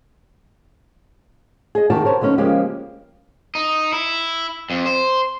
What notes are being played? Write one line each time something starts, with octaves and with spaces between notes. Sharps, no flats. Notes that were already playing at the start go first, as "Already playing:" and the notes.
G#4 D#5
C3 D#3 F#4 G4 A5
A#4 C5 C#5
D3 F#3 B3 C#4 D#4
C#3 F3 G#3 A#3 C#4 G4
D#4
E4
F2
C5